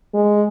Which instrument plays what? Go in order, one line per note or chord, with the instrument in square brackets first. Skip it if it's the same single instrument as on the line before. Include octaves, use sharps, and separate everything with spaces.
[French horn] G#3